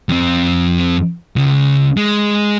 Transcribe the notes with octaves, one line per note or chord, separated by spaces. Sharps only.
F2 C4
C#2 C#3
G#3